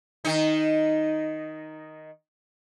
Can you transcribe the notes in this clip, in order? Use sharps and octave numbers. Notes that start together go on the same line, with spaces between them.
D#3 D#4